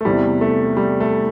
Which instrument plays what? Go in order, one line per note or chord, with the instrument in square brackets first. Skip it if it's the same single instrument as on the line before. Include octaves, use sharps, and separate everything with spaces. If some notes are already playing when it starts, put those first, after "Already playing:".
[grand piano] A3
E2 C3 E3 G3
A3
G3
A3